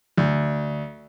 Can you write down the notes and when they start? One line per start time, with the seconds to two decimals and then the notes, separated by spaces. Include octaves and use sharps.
0.17 D2